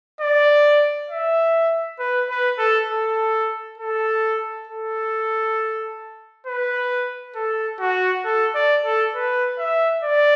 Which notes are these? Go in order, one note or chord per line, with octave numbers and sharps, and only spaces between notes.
D5
E5
B4
B4
A4
A4
A4
A4
B4
A4
F#4
A4
D5
A4
B4
E5
D5